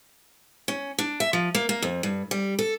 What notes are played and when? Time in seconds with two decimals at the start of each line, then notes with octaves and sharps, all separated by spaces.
0.68 C#4
0.99 D4
1.20 E5
1.33 F3
1.55 A#3
1.69 A#3
1.82 F2
2.03 G2
2.31 G3
2.59 A4